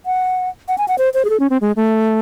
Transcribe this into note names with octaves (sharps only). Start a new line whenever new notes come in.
F#5
F#5
G#5
F#5
C5
C5
G#4
A4
C#4
C4
G#3
A3